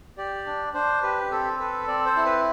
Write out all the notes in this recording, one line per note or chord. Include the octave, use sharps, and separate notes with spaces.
G4 D5
D4
D4 C5
G4 B4
C4 A4
A4 B4
C4 D5
C5
E4
B4